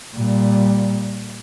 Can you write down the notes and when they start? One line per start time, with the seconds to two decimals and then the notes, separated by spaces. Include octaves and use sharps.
0.16 A#2 G3